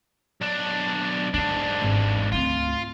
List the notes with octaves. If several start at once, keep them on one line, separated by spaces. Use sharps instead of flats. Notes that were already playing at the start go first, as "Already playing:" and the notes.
B1 D4
G#2 D3 D4
G#1 E2
D2 C4 F4